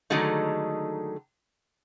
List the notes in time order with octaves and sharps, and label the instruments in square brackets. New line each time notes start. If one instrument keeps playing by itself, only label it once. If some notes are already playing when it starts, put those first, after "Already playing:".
[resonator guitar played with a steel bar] D3 D#3 F#3 G#3 A3 D#4